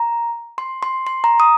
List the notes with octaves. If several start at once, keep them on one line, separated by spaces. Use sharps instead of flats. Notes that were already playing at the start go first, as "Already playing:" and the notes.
Already playing: A#5
C6
C6
C6
A#5
D#6